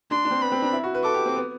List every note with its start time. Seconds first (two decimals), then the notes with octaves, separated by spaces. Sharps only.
0.11 D4 C6
0.25 D4
0.31 C4
0.41 B3 B5
0.52 C4
0.62 D4
0.73 E4
0.83 F#4
0.95 B4
1.04 A4 D6
1.14 G4
1.26 C4
1.36 B3